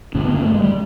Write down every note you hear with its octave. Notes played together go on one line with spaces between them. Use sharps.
G2 D3 C#4
B3
A#3
A3
G#3
G3